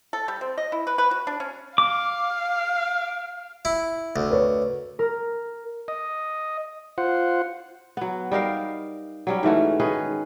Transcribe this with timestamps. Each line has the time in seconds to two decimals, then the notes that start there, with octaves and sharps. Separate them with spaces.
0.13 A4
0.28 G3
0.41 C4
0.58 D#5
0.72 E4
0.87 B4
0.98 B4
1.11 F#4
1.27 D4
1.40 C#4
1.78 F5 D6
3.65 E4
4.16 D2
4.31 B4 C#5
4.99 A#4
5.88 D#5
6.98 F4 C5 F#5
7.97 F#3 B3
8.31 G3 D#4 A#4 F5
9.27 F#3 G3 C#4
9.43 G#2 E3 A3 F#4
9.80 D#3 C#4 G#4 B4